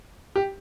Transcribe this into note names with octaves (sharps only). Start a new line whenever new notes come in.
G4